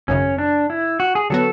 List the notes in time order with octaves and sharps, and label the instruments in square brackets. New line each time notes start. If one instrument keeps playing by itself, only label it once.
[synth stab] G#1 F#2 C#3 [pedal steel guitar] C#4
[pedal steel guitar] D4
E4
F#4
G#4
[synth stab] D3 F#3 B3 F#4 [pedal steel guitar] A4